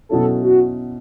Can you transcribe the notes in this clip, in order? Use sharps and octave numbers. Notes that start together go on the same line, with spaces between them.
B2 F#3 C#4 E4 A4
F#4